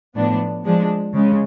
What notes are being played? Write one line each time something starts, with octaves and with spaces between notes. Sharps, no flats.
A2 F3 B3 D4
F3 G#3 D4
C#3 G#3